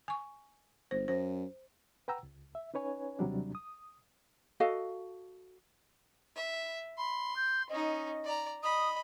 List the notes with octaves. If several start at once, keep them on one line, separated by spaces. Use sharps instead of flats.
G#5 C#6
G1 C5
F#2 C5
B4 F#5 G5 A#5 E6
C#2
E5
C#4 D#4 B4 C#5 G#5
D#2 C3 F#3 G3 D4
D#6
F#4 A4 D#5 F5
E5
B5 C6
G6
C#4 D#4 D#5
D5 A#5
D#5 B5 D#6